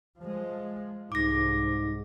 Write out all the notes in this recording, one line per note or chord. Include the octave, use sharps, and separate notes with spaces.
F3 G#3
C2 G#2 D6 A#6